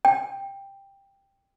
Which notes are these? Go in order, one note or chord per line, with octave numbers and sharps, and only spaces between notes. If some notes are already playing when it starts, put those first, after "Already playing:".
G5